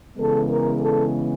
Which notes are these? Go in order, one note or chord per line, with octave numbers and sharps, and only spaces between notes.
C#3 E3 G#3 B3 A4
A#4
A4